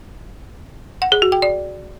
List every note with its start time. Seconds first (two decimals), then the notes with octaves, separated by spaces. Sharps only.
1.02 F#5
1.12 G#4
1.22 F#4
1.32 G5
1.42 D5